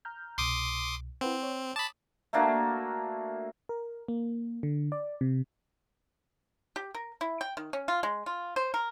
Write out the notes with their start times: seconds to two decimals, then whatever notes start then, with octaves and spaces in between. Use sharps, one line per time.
0.05 A#5 F6 G6
0.38 C2 B2 C6 D6 D#6
1.21 C4 E4 B4 F#5
1.43 C#5
1.76 A5 B5 D6 D#6
2.33 A3 A#3 D4 F#4
3.69 A#4
4.08 A#3
4.63 D3
4.92 D5
5.21 C3
6.76 G4
6.95 A#4
7.21 E4
7.41 G5
7.57 D#3
7.73 C#4
7.88 F4
8.03 G#3
8.26 F4
8.56 C5
8.74 A#4